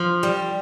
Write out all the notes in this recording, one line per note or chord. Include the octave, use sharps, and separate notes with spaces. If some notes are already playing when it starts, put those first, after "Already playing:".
Already playing: F3
G3